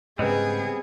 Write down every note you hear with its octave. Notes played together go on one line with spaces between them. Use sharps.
G#2 C#3 G3 B3 C4 G#4 B4 D#5